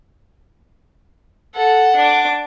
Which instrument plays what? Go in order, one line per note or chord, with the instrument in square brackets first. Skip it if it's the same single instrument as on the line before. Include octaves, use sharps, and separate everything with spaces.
[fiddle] A4 [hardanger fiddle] F#5
[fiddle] D4 D6